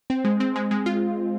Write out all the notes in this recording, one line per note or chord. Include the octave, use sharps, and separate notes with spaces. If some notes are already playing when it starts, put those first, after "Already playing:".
C4
G#3
C4
G#3
G#3
F4